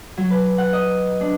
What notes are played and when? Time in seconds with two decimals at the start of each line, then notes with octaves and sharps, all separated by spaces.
0.17 F#3
0.30 B4
0.58 F#5
0.73 D#5
1.21 D4